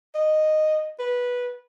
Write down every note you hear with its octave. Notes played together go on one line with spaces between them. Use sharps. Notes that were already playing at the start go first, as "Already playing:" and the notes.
D#5
B4